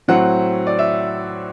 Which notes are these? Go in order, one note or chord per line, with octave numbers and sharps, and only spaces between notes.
A2 F#3 C4 F#5
D5
E5